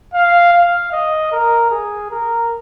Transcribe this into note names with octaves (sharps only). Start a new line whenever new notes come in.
F5
F5
D#5
A#4
G#4
A#4